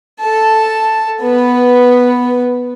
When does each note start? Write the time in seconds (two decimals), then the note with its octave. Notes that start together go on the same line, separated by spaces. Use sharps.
0.20 A4 A5
1.22 B3 B4